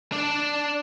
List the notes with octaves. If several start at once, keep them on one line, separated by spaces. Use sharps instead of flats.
D4 D5